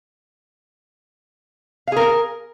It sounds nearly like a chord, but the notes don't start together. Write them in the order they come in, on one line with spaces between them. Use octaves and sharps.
F5 G#4 A#4